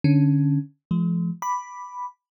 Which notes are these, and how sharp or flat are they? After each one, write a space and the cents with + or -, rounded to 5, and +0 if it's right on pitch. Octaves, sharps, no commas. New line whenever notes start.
D3 +0 C#4 +0
F3 -30 G#3 +45
B5 +0 D6 +0